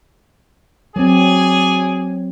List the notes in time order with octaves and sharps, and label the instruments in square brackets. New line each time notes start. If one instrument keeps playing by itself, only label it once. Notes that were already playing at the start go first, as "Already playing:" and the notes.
[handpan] F#3 C4 [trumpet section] G#4 D5 G#5